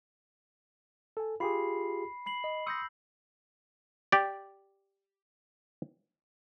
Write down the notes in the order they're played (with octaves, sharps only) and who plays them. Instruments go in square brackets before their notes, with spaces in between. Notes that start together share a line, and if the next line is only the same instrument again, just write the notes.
[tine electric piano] A4 G#5
[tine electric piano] F4 G4 G#4 [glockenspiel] B5 C7
[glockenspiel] B5 C7 F#7
[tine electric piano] D#5
[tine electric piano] C6 D#6 C#7 [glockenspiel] E6 G6 A#6
[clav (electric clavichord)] G4 D5